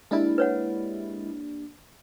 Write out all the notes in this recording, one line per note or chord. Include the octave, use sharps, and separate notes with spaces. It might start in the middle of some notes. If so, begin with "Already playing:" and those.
G#3 A#3 D4 E4 G4
B4 C#5 F#5